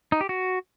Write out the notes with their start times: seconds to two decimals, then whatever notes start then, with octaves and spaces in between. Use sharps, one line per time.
0.12 D#4
0.21 G4
0.29 F#4